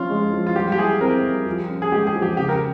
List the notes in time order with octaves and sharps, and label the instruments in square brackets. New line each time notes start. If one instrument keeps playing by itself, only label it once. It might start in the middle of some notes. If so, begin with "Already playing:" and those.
Already playing: [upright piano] F3 C#4 [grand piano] F4
[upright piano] G#3
F3
[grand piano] F4
[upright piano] G3 [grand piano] G4
[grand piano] G4
[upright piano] E4 [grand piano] G#4
[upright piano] C4 [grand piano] A#4
[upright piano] G3
F3
C#4
[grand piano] G#4
[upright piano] G#3 [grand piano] G4
[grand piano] G#4
[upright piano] F3
[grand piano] G4
[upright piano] C#3 [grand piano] G4
[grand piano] A#4